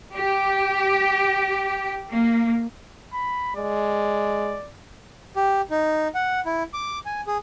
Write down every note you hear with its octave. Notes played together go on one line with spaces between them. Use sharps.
G4
A#3
B5
G#3 D5
G4
D#4
F#5
E4
D6
G#5
G#4